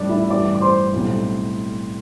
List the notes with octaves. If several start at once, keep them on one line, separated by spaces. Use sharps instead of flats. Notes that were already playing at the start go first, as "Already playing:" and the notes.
Already playing: A1 A2 G3 D4 D5
E4 E5
A1 G2 E3 D5 D6
D6
C5 C6
B1 A2 G3 C4